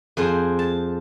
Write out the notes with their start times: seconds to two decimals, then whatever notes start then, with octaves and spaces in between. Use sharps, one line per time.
0.17 F2 G#4 C5 G5
0.59 A5